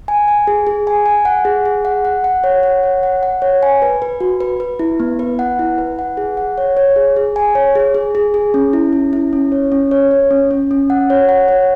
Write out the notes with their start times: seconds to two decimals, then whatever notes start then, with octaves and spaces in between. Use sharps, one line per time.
0.08 G#5
0.28 G#5
0.47 G#4
0.67 G#4
0.87 G#5
1.06 G#5
1.25 F#5
1.45 G#4
1.66 G#4
1.85 F#5
2.05 F#5
2.24 F#5
2.44 C#5
2.63 F#5
2.83 C#5
3.03 F#5
3.23 F#5
3.42 C#5
3.63 G#5
3.82 B4
4.02 B4
4.20 F#4
4.41 B4
4.60 B4
4.79 E4
5.00 B3
5.19 B4
5.39 F#5
5.59 E4
5.78 B4
5.99 F#5
6.17 G#4
6.37 F#5
6.58 C#5
6.77 C#5
6.96 G#4
7.16 G#4
7.36 G#5
7.55 C#5
7.75 G#4
7.94 G#4
8.15 G#4
8.34 G#4
8.54 C#4
8.73 E4
8.93 C#4
9.13 E4
9.33 C#4
9.52 C#5
9.72 C#4
9.91 C#5
10.11 C#5
10.31 C#4
10.51 C#4
10.71 C#4
10.90 F#5
11.10 C#5
11.29 F#5
11.48 C#5